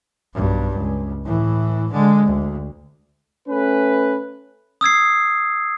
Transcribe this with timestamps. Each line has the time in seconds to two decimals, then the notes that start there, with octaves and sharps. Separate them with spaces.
0.34 B1 G2
0.75 C#2
1.25 A2 E3
1.91 D3 G#3
2.25 D2
3.48 A3 C#4 B4
4.81 D#6 E6 G#6 C7